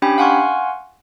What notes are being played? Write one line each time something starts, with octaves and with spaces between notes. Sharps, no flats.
C#4 D4 G4 G5 G#5 B5
F5 F#5 G#5 C6 C#6 F6